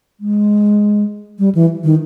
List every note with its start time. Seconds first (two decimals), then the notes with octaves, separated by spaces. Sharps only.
0.20 G#3
1.39 G3
1.55 E3
1.84 D#3